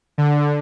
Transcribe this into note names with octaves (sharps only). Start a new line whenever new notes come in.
D3